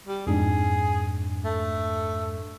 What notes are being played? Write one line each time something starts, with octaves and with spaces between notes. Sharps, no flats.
G3
F2 G#2 D4 G#4
A3